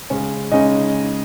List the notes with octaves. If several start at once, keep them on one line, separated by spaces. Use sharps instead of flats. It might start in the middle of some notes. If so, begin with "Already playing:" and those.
C#3 G#3 C#4 C#5
C#3 G#3 C#4 D#4 D#5